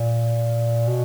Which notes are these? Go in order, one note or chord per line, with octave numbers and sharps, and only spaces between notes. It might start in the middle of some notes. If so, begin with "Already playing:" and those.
Already playing: A#2
B2